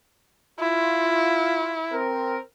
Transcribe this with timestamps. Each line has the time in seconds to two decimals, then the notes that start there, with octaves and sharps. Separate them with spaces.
0.60 E4 F4
1.92 C4 A#4